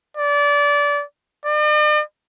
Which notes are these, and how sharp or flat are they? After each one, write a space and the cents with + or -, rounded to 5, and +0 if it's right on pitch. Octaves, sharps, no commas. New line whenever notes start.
D5 -25
D5 +45